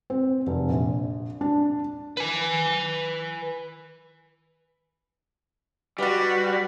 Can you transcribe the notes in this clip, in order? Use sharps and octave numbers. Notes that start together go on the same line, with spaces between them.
C4
F1
A#1
D4
B4 G#5
G3 F#4 G4 B4 D5